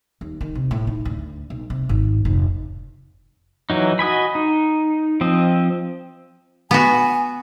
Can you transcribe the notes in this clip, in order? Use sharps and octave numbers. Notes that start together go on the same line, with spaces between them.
D#2
D#3
C3
A2
D#4
D2
B1
C3
G#1
F1
E3 F#3 D#4
F#4 D#5 G#5 B5
D#4
F3 C4 D#5
B3 F#4 G#5